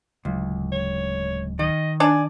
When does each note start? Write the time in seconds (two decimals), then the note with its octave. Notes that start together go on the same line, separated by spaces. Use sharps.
0.25 D1 C#2 F#3
0.72 C#5
1.59 D#3 D#5
2.00 D4 D5 G#5